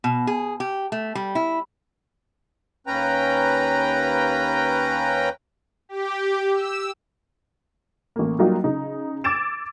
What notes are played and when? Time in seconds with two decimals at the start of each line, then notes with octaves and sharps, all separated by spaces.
0.04 B2
0.27 G#4
0.60 G4
0.92 A3
1.15 G3
1.35 E4
2.87 D#2 C#4 B4 G5 A#5
5.89 G4
6.54 E6
8.16 A1 A#3
8.39 F#3 G3 A#3 D#4 F4 F#4
8.64 C#3 D#4
9.24 D6 E6 G#6 A6 D7 E7